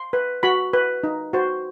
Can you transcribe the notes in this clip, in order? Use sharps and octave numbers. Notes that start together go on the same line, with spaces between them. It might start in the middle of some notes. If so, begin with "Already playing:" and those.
Already playing: C6
B4
F#4 B5
B4
D#4
F#4 C5